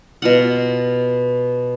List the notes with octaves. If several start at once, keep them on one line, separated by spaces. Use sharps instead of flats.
B2 F4 F#5